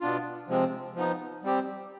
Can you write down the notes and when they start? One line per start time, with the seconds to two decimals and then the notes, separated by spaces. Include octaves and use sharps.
0.01 B2 B3 D4 F4
0.48 C3 F3 G#3 C4
0.95 F3 B3 D#4
1.43 G3 C4 G4